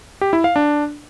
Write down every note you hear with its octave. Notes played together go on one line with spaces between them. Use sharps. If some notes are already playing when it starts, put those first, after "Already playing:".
G4
E4
F5
D4